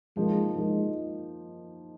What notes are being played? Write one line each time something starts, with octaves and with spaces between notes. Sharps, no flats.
F3 G#3 A#3 D#4
F3 G#3 A#3 D#4